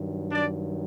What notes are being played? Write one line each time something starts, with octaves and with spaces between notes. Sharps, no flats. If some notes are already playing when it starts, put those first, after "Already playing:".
Already playing: G2 D#3 F#3
D4 D5